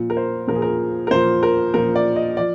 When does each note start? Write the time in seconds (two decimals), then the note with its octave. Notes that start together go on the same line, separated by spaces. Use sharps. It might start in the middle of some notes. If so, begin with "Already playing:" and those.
Already playing: A#2 F3
0.10 A#4
0.17 C5
0.47 A#2 F3 A#4
0.55 G#4
0.62 A#4
1.07 A#4
1.11 A#2 F3 C5
1.43 A#4
1.74 A#2 F3 A#4
1.96 D5
2.16 D#5
2.37 F3 D5